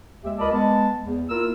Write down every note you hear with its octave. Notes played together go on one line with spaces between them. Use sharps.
D#2 G#3 G4 E5
C#2 A#4 D5 D#5 A5 B5
G#3 B3 A5
E2
A#3 E4 F4 A#4 E6